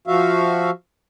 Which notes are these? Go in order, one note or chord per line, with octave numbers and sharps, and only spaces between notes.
F3 F#4 E5 F5